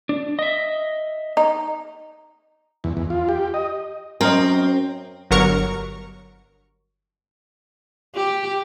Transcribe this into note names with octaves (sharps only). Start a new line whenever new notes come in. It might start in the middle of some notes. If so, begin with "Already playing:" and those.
D4
D#5 E5
D#4
E2
E2
F4
G4
D#5
F#2 C4 A#4 D#5
G1 F#3 A#4 C#6
G4